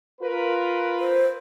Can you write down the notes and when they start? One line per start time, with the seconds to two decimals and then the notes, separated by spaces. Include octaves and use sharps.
0.21 F4 A#4 B4
1.00 C5